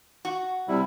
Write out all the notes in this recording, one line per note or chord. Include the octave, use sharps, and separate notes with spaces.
F#4
C3 G3 E4